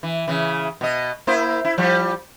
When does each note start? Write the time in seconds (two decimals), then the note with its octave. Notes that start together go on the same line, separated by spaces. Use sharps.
0.03 E3
0.28 C#3 E3
0.81 B2 D#5
1.27 A#3 E4 C5
1.65 E4
1.78 F3 G3